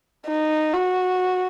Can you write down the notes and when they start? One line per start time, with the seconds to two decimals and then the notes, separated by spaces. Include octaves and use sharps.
0.28 D#4
0.74 F#4